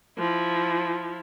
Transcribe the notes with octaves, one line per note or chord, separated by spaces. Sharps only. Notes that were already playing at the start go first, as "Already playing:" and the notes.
F3 E4